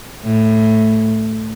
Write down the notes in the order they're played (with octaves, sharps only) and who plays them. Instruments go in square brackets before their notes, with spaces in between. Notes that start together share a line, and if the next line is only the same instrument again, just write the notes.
[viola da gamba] A2